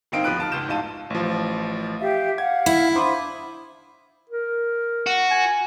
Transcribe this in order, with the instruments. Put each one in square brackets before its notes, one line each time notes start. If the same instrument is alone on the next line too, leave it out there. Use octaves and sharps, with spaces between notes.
[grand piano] G1 D#3 C4 D#4 F5 D7
D1 F3 B3 B4 F#6 D7
A5 F6
C#2 G#2 G6 E7
A1 G#2 F4 A5 D#7
[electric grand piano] A1 F3
[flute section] G4 E5 F5
[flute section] F5 F#5 [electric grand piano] G#6
[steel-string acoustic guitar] E4
[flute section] D4 D6 D#6 [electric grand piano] C5 B5 C6
[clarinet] A#4
[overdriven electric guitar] F#4
[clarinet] G#5